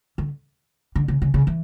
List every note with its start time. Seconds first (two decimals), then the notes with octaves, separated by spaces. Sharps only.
0.18 D3
0.96 D3
1.08 C#3
1.22 C#3
1.34 C#3
1.47 E3